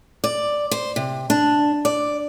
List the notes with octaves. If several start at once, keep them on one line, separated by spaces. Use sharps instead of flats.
D5
C5
C3
D4
D5